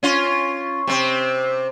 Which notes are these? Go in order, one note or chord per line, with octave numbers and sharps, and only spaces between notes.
C#4 F4
C3 C4